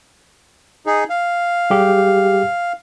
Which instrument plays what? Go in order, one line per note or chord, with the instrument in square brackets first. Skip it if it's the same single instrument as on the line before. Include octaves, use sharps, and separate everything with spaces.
[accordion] D#4 G#4
F5
[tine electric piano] G3 G4 G#4